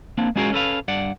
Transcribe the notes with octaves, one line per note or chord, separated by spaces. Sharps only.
A#3 C4 D4
G#3 C#4 F4 F#4 G#4 A#4
C#4 A4 B4 F5
G2 D5 F#5